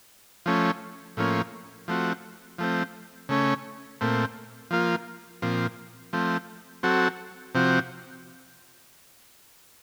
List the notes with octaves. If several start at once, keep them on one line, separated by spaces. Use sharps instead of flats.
F3 A3 C#4
A2 F3 A#3 C#4
F3 A3 C4 F#4
F3 A3 C4
C#3 A3 C#4
A#2 A3 C4
F3 A#3 F4
A#2 F3 C4
F3 A3 C4
F#3 C4 F#4 A4
C3 F3 C4 F#4